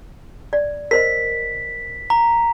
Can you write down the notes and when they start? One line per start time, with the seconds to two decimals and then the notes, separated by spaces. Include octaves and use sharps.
0.53 D5
0.91 A#4 C5 D#5 B6
2.10 A#5